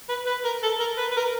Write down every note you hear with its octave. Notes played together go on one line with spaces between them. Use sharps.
B4
B4
A#4
A4
A#4
B4
B4
A#4